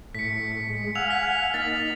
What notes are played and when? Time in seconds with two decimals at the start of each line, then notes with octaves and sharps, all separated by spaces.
0.15 A2 B6 C#7
0.70 G#3
0.95 F5 F#5 G#5 E6 F7
1.10 F6 B6
1.54 A#3 D#4 A6 B6